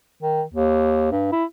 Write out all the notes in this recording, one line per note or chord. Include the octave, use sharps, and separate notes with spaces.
D#3
D#2
G2
E4